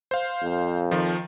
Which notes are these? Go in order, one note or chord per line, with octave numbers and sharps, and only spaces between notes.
C5 F5
F2
D#3 F3